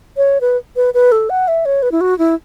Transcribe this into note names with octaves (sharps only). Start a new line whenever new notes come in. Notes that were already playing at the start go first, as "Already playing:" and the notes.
C#5
B4
B4
B4
A4
F#5
E5
C#5
B4
E4
F#4
E4